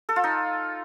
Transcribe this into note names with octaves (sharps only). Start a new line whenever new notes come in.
A4
F4
D#4